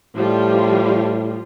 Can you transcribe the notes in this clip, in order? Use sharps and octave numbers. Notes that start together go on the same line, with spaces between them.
A2 F3 G3 F4